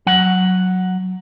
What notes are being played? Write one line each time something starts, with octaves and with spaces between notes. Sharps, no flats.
F#3 F#5